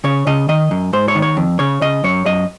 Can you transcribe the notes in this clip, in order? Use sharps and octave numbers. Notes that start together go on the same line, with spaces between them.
C#3 C#5
C#3 D#5
D#3 D#5
F#2
G#2 C5
C#5
D#3
C#5
F2
C#3 C#5
C#3 D#5
F#2 C#5
F#2 D#5